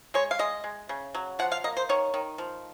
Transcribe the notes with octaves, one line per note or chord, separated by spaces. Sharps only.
G#3 C#5
F5
G#3 D#5
G#3
C#3
F#3
F3 F#5
F5
A#3 D#5
C5
D#3 C#5
D#3
F3